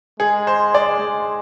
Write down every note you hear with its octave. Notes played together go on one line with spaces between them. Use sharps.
G#3 G#4
C5
D5
G#3